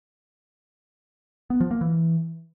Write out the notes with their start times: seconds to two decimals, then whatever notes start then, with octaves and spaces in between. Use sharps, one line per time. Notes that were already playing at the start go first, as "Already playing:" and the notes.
1.50 B3
1.61 F3
1.71 A#3
1.81 E3